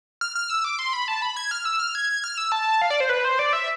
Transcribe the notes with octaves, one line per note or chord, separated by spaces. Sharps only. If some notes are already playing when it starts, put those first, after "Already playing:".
F6
F6
E6
D6
C6
B5
A5
B5
G#6
F6
E6
F6
G#6
F6
E6
A5
F5
D5
C5
B4
C5
D5
E5